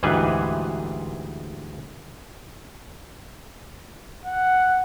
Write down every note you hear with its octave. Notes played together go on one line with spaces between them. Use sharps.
D2 G#2 E3 G3 G#4 B4
F#5